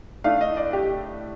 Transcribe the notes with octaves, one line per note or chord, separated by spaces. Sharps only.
A2 A3 D4 F5
D#5
D5
G4